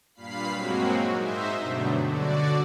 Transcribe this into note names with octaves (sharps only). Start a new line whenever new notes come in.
G2 A#2 F5 B5 C7
F#3 G#3 A#3 C4 F#4
G#2 D#4 C5 E5
G2 B2 D3 F#3 A3
D3 F#4 D5